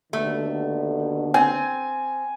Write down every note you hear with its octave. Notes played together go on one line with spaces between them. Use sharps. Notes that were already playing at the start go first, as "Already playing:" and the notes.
D#2 B2 D3 A3
C4 G#5